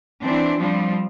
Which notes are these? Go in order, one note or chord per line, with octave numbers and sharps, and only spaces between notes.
E3 C4 D4
F3 G3 C4 D4